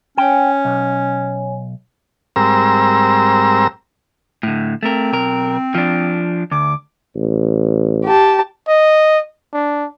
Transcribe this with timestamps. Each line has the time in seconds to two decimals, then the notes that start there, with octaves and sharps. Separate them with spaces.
0.18 C#4 C#5 G5 G#5
0.65 B1
2.36 G#2 G3 C4 A#4 A#5 E6
4.43 A2 D3
4.83 A3 C4 A#4
5.12 B1 A#4
5.75 F3 D4
6.51 D2 D6
7.15 A1
8.05 G4 A5
8.68 D#5
9.53 D4